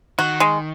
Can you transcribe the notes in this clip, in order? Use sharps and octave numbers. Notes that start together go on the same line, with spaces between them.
D#3 F#4
G#3